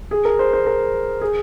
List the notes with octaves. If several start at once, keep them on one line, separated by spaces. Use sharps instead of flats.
G#4
A#4
C5
C5
A#4
G#4